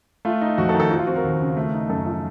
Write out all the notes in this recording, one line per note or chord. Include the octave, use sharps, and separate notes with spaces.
A3 F4
D#4
F2 F#4
A4
D#3
A4
F3 F#4
F4
C4 F#4
A#4
D#2
C#3
A3
D#4
F#2 A4
F3